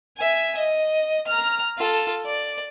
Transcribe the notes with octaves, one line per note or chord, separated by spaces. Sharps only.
E5 G#5
D#5
A#5 F6
F4 A4
D5